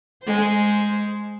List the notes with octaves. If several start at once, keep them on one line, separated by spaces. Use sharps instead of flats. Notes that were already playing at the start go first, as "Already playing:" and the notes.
G#3 C5